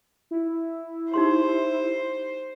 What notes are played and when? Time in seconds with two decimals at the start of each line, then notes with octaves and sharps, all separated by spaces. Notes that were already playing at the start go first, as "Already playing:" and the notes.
0.31 E4
1.14 D#4 G4 C5 C6